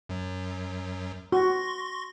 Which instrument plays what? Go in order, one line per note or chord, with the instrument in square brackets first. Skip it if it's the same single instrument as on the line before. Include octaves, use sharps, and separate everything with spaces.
[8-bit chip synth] F#2 F#3
[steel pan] F#4 [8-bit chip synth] C6 C#6 A#6